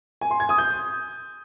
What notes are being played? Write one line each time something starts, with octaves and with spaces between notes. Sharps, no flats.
G#5
C6
G#6
D#6
G6